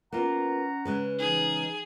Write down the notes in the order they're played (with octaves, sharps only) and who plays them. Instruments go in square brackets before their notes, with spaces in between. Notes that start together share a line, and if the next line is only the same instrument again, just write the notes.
[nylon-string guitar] A#3 B3 F4 [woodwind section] C#4 F#5 A#5
[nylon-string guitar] C#3 G#3 B4
[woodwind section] E3 D#4 [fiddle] G#4